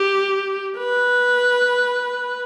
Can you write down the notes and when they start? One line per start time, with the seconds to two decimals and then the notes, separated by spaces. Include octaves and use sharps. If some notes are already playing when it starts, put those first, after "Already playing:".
Already playing: G4
0.78 B4